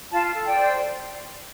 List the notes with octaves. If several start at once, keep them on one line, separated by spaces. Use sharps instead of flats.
F4 F5 A5
A4
D5 G5
C5